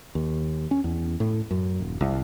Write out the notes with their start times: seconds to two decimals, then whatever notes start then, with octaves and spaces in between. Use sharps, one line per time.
0.15 D#2
0.71 C#4
0.84 E2
1.20 A2
1.51 F#2
1.80 D#1
2.01 C2